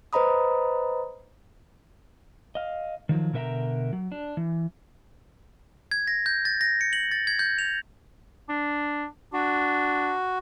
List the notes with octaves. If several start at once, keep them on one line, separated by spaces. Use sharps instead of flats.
B4 C5 D#5 A#5 B5 D#6
D#5 F5
D#3 F3 F#3
B2 D3 A#4 E5 G5 A#5
F#3
D4
E3
G#6
A#6
G6
A6
A#6
C#7
F#7
A6
G#6
G6
F7
D4
D4 F#4